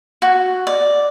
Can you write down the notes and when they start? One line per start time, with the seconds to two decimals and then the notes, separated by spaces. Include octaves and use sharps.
0.22 F#4
0.67 D5